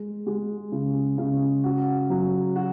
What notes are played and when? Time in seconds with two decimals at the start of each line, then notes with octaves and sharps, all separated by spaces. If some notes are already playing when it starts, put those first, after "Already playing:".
Already playing: G#3
0.27 G#3
0.72 C#3
1.18 C#3
1.64 F#4
2.10 F#3
2.56 F#4